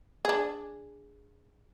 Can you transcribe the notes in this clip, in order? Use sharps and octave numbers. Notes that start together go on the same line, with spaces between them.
D4 G#4